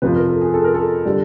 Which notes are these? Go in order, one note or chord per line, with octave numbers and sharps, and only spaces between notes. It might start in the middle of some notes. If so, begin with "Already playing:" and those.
F2 C3 F3 B4
A#4
A4
G#4
A4
A#4
A4
D3 G3